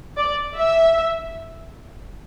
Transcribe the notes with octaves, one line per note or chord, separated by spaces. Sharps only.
D5
E5